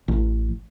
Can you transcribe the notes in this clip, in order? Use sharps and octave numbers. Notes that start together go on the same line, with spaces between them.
A1